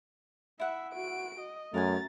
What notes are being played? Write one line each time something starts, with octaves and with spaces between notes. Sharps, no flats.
E4 E5 F#5
F#4 D7
D#5
F#2 A3 A#4 F#5 G#5 A#5 A6